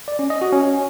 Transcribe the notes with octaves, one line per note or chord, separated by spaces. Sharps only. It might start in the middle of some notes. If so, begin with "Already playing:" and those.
D5
C#4
D#5
F#4
C#4